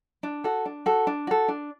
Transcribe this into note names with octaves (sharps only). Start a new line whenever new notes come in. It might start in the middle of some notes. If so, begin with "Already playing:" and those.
D4
F#4 A4
D4
F#4 A4
D4
F#4 A4
D4